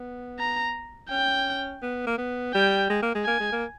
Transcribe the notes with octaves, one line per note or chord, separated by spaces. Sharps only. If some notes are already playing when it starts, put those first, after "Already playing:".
Already playing: B3
A#5
C#4 G5
B3
A#3
B3
G3 G5
G#3
A#3
G#3
A#3 G#5
G#3
A#3